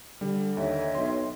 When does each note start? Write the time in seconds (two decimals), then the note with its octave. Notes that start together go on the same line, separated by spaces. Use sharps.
0.21 D3 G3
0.57 D#2 C#5 D#5 E5 G5
0.95 B1 C6